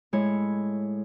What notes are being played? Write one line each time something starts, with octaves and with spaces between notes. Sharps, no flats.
A2 G#3 E4 C#5